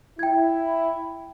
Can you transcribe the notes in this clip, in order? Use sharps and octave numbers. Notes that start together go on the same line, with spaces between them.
E4 G5 G#6